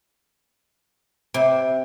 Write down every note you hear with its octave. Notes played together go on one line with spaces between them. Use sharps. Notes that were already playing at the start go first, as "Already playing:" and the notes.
C3